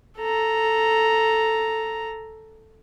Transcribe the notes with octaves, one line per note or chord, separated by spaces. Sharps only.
A4 A#5